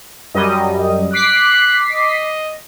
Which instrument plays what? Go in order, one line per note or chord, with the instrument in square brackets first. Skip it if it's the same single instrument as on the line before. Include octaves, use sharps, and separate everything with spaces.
[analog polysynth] F#2 G3 D#5
[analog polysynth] D6 B6 C7 [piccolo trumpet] F#6
[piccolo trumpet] D#5